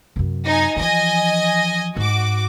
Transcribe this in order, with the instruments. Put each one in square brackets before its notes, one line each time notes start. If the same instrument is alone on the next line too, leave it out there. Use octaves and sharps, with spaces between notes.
[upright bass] F#2 C3
[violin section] D#4 G#5
[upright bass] E3 F3 [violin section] D#5 G#5
[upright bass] G#2 [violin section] F#4 D6